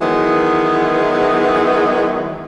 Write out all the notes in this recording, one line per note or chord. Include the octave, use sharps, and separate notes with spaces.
D#3 E3 F#3 G#3 B3